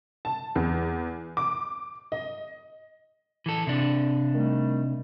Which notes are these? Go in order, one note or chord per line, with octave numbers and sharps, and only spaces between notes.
A5
E2
D6
D#5
E3 A4
C3 D4
D#3 G3 A3